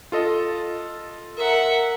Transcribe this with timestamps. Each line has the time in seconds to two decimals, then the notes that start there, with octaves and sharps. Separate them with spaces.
0.12 F4 A4 D#5
1.37 A#4 E5 F#5